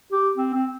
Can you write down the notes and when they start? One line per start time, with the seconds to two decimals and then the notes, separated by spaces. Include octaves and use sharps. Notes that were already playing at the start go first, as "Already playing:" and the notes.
0.12 G4
0.37 C4
0.54 C4